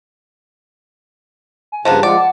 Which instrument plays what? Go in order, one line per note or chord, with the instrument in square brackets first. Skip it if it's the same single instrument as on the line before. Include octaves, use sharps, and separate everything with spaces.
[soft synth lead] G#5
[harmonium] G2 C#3 [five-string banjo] F3 A#3 B3 [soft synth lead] A5
[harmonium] F3 G#3 F4 [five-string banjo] D5 [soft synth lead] F#5
[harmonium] A5